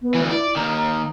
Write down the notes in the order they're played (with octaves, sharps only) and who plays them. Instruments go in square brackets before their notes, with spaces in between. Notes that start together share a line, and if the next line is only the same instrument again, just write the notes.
[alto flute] B3
[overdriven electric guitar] D2 E3
[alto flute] E4 [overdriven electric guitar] D5
[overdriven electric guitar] D#2 D#3 [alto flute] A#5
[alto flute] A#5